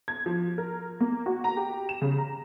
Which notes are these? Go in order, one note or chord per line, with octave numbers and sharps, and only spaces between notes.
G#6
F3
A#4
A#3
F#4
A#5
G4
E7
C#3
A#5